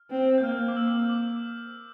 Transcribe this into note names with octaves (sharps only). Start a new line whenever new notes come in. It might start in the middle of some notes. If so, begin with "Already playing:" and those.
Already playing: F6
C4
G6
A#3 F6
D6
E6
D6
E6
D6